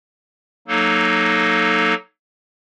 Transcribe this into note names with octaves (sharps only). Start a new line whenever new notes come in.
F#3 A#3 D#4 A4